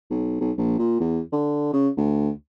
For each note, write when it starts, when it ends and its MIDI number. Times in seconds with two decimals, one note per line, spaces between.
0.10 0.38 35
0.40 0.52 35
0.58 0.78 34
0.79 0.96 46
1.00 1.21 40
1.32 1.71 50
1.73 1.89 49
1.97 2.31 38